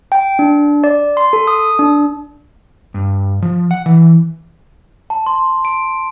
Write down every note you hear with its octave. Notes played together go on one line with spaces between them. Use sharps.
G5
D4
D5
C6
A4
D#6
D4
G2
F3
F#5
E3
A5
C6
D7